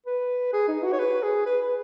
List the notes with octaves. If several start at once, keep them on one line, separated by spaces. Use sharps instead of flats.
B4
G#4
D#4
F#4
C#5
B4
G#4
B4
B4